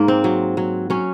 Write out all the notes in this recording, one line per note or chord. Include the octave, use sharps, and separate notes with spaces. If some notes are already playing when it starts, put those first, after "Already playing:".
Already playing: G#2 A#3
C4
F#3
F#3
F#3 C#4